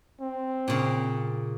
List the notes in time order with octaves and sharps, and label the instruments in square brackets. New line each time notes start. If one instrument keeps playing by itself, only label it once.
[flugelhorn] C4
[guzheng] A#2 C#3